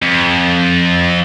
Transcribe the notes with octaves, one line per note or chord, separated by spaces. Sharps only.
F2